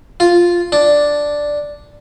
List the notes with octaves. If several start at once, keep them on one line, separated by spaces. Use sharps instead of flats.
F4
D4